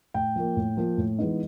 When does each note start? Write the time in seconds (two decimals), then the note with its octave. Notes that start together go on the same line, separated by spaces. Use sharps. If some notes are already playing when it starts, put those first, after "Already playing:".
0.14 A2 G5
0.36 F3 A#3
0.57 A2
0.77 F3 A#3
0.98 A2
1.19 E3 G#3 B3 D#4